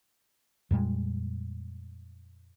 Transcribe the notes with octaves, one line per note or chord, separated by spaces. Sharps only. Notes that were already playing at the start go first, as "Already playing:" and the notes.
F2 A#2 G3 G#3